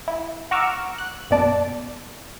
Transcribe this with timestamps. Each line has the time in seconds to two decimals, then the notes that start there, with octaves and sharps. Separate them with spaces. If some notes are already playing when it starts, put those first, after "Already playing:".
0.08 E4
0.51 F#5 A#5 C#6 D6 E6 F6
0.98 F#6
1.30 A#1 F#2 B2 D5 A5 D6